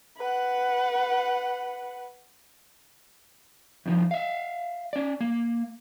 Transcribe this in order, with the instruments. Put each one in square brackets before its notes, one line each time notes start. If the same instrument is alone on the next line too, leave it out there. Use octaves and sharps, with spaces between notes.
[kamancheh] B4 F#5
[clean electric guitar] F2 D#3 F3
E5 F5
C#4 D5
A#3